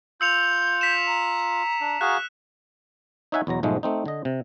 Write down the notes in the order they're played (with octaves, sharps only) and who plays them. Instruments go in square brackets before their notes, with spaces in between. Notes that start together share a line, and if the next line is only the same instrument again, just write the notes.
[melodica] F4 [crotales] E6 C#7 F7 [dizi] G6
[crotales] B6 E7
[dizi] A#5
[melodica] D4
[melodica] F#4 G#4 F5 [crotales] F#6
[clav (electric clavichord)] D#4 C#5 E5 F#5 G#5
E2 B2 F#3 A#5
B1 G#2 F3 G#3 A3
A3 C4 D#4
D3 D#5
C3